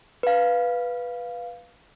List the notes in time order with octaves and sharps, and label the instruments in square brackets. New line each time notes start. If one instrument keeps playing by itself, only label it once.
[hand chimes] B4 F5